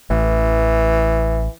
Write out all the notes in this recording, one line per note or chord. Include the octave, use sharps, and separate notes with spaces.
A1 E3